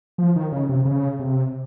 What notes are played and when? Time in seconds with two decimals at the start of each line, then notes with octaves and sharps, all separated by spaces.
0.18 F3
0.36 D#3
0.52 C#3
0.69 C3
0.85 C#3
1.19 C3